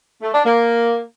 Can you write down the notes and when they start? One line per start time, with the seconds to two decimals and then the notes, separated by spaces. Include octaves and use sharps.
0.22 A3
0.34 D4
0.45 A#3